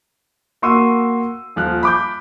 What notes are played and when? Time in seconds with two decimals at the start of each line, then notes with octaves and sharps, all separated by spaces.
0.62 A#3 F#4 C6 C#6 E6 D#7
1.56 D#1 F3 F6 F#6
1.83 B5 D6 G6